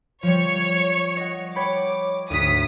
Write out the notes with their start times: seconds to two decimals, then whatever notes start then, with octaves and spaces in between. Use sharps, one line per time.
0.23 F3 G3 C#5 C#7
1.17 D#5 F#5
1.56 C#5 G5 B5 D6
2.30 D2 G#2 F#4 D#6 B6